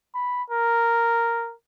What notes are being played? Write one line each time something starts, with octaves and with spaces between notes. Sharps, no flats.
B5
A#4